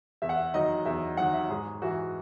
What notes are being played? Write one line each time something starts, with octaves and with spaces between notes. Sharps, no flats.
E2 E5
F#5
E5
D#3 F#3 D#5
E2 E5
D#3 F#3 F#5
E5
G#2 G#4
E3 F#4